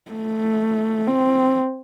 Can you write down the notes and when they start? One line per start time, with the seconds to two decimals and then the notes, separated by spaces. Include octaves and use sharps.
0.12 A3
1.07 C4